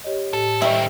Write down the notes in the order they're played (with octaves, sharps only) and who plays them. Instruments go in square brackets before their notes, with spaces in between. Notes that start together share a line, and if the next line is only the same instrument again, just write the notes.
[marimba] G4 C#5 D#5
[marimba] A2 G4 [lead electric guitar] A4
[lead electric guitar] D#3 C4 [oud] E4 [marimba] D#5 C#6